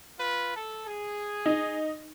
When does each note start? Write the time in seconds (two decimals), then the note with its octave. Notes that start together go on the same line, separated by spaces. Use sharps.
0.19 F4 B4
0.55 A4
0.87 G#4
1.46 D#4